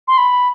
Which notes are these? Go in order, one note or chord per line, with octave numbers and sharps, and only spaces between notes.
C6
B5